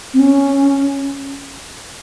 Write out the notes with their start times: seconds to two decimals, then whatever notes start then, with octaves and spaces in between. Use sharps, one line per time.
0.14 C4
0.20 C#4